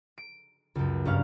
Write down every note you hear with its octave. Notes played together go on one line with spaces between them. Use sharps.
D7
C#2 F#2
G1 C#4 D4 F5